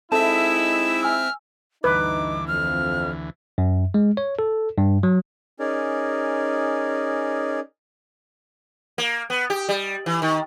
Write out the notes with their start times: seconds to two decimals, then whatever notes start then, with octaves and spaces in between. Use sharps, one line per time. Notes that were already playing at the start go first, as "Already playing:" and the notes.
0.12 G#3 C4 D#4 E4 A4 E5 A5 E7
1.03 G#5 E6 F6
1.84 D2 G2 E3 D#4 B4 D6
2.48 F2 F6
3.58 F#2
3.94 G#3
4.17 C#5
4.39 A4
4.78 G2
5.03 F#3
5.59 C#4 D#4 G#4 A#4 D5
8.98 A#3
9.30 B3
9.50 G4
9.69 G3
10.06 E3
10.22 D#3